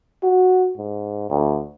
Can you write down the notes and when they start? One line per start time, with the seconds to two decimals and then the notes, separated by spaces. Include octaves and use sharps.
0.23 F#4
0.78 G#2
1.30 D2